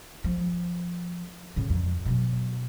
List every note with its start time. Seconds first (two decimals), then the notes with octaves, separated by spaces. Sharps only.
0.24 F3
1.56 A2 C#3
1.70 F2
2.06 B2 F#3